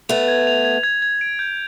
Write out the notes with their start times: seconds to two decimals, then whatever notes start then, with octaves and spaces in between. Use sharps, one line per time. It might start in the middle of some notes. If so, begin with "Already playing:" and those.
0.09 A3 B3 F7
0.28 G#6
0.47 F7
0.65 G#6
0.83 G#6
1.02 G#6
1.21 D7
1.39 G6